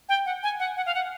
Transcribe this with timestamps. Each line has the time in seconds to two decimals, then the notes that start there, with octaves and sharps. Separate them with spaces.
0.09 G5
0.26 F#5
0.43 G#5
0.59 F#5
0.76 F#5
0.86 F5
0.95 F#5